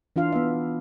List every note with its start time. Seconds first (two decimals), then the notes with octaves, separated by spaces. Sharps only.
0.16 E3 D4 F4 F5
0.32 B3 E5